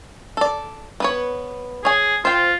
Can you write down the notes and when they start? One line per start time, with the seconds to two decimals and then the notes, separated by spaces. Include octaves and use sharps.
0.37 A4 D5
1.00 B3 B4 C#5
1.85 G#4 C#5 G#5
2.25 F4 C5 G5